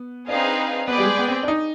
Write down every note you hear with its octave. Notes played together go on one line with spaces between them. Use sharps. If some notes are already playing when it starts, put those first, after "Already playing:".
Already playing: B3
C4 D4 D#4 G#4 B4 F5
B3 G#4 B4 D5 G5
G3
G#3
B3
C4
D4
D#4